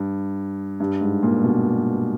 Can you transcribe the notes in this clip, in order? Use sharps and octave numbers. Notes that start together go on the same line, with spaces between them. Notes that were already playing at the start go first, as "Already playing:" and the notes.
Already playing: G2
G2
G#2
A#2
B2